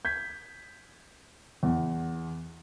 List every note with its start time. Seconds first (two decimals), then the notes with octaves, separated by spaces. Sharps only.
0.05 G6 G#6 B6
1.63 E2